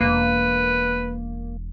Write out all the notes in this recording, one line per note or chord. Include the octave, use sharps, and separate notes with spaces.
E1 A#3 B4